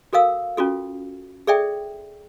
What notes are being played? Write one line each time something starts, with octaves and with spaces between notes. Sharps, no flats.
F#4 A4 A#4 F5 E6
C#4 F4 F#4 A4
G#4 A4 D5 E5 G5